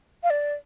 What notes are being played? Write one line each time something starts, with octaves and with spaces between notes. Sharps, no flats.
F5
D5